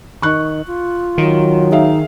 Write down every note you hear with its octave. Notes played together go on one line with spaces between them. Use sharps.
D#3 C#6 F#6
F4
D#3 F#3
D#4 G#4 E5 F5